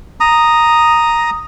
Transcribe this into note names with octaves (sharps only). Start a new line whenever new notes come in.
A#5 D#6